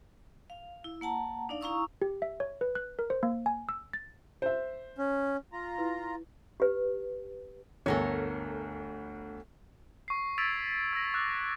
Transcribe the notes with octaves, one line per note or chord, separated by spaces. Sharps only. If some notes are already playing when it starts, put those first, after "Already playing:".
F5
E4
A#3 F#5 A5 A#5
D4 D#4 D5 F5
E4 F5 A#5 C#6 D#6 E6
G4
E5
C#5
B4
F#6
A#4
C5
A#3
G#5
E6
A6
C5 E5
C#4
F4 A#5
E4 B4
G4 B4
G1 D2 A4 A#4 C#5
C#6 C7
E6 G#6 A6 B6 D7 F7
E6 A#6
D6 E6 F#6